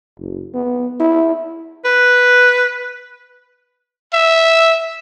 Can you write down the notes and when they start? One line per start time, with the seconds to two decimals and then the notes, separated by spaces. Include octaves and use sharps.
0.18 F#1
0.54 B3
1.00 E4
1.85 B4
4.13 E5